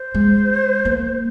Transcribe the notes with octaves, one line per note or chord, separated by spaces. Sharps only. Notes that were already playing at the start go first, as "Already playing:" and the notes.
Already playing: C5
G#3
A#3